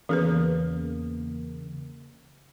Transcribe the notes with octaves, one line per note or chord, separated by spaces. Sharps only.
E2 C#3 E3 A#3 G#4 B4